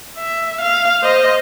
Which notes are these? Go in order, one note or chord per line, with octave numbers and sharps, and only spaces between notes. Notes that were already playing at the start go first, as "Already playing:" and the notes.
E5
F5
C5 D#5